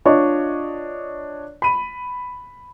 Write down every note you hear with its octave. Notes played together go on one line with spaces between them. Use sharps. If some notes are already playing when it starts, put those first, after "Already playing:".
D4 F4 C#5 D#5 C#6
B5 D#7